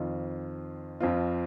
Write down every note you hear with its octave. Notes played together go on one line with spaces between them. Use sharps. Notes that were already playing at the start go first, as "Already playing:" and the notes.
Already playing: F2 D#3 C4 F4
F2 F3 C4 F4